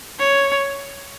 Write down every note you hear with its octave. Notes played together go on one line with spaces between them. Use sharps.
C#5